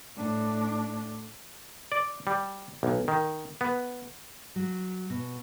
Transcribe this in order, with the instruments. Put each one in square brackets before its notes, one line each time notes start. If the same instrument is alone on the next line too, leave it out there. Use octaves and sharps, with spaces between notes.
[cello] A2 D4
[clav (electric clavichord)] D5
G3
B1
D#3
B3
[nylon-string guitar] F#3
B2